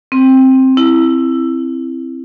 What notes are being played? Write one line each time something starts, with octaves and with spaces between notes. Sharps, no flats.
C4
E4